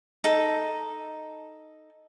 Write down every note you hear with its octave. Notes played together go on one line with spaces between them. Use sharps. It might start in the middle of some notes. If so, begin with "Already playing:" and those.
D#4 A4